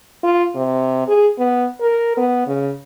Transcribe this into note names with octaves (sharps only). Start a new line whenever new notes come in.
F4
C3
G#4
B3
A#4
B3
C#3